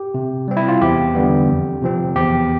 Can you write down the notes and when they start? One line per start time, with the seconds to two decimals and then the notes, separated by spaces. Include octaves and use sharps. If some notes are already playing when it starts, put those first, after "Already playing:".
Already playing: G4
0.14 C3
0.48 G3 C4
0.57 E4
0.68 F4
0.82 E2 G4
1.15 D3 G3 B3
1.49 F2
1.82 C3 F3 C4
2.16 E2 G4